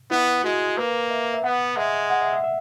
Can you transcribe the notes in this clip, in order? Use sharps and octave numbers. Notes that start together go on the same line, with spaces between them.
B3 E4
G#3 F#4
A#3 B4
E5
E5
B3 F#5
G#3 E5
F#5
E5
E5
E5